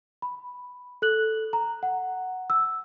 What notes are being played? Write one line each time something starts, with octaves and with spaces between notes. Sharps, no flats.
B5
A4 F#6 F#7
A#5
F#5
E6